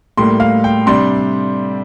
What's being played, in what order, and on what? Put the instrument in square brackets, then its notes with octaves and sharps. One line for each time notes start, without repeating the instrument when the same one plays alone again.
[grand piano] A2 G3 A#3 C6
F5
G5
C3 G3 D4 C6